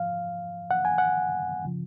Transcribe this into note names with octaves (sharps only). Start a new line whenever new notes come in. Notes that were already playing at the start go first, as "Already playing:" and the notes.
Already playing: G#2 F3 F5
F#5
G#5
F#5
C#3 F3